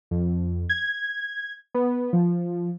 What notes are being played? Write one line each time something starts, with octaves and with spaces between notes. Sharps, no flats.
F2
G#6
B3
F3